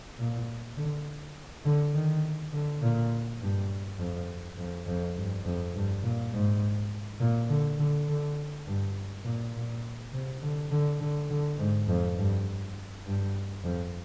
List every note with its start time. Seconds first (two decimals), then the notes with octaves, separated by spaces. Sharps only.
0.19 A#2
0.77 D3
1.65 D3
1.94 D#3
2.52 D3
2.82 A#2
3.40 G2
3.98 F2
4.57 F2
4.87 F2
5.15 G2
5.44 F2
5.74 G2
6.03 A#2
6.32 G#2
7.20 A#2
7.49 D3
7.79 D3
8.08 D3
8.66 G2
9.24 A#2
9.54 A#2
10.13 C3
10.42 D3
10.71 D3
11.00 D3
11.29 D3
11.58 G#2
11.88 F2
12.17 G2
13.05 G2
13.64 F2